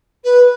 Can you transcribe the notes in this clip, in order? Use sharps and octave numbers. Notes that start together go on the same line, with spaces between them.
B4